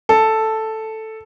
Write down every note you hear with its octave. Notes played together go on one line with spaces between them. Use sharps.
A4